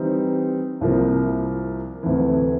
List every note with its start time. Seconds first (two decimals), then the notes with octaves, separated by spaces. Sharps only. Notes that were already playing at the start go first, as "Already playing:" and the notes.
Already playing: E3 G3 C4 D#4
0.81 C2 C3 F3 A#3
2.03 D2 C3 E3